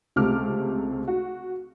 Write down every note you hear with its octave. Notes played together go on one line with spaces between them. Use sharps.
C#2 C3 A3 D6 F6
F#4